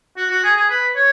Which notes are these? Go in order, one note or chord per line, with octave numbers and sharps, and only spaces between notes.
F#4
F#4
G#4
G#4
B4
C#5